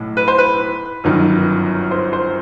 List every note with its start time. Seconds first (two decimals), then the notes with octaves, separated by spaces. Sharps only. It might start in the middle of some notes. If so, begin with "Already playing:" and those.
Already playing: B1 A2
0.17 B4
0.28 C5
0.38 B4
1.04 G1 F#2 D#3
1.91 C5
2.13 C5